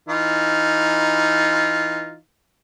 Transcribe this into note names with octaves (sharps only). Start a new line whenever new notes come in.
E3 D#4 F4